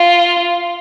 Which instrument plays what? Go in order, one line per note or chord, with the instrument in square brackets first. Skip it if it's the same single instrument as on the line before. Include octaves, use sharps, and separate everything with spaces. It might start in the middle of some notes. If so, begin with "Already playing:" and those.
Already playing: [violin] F4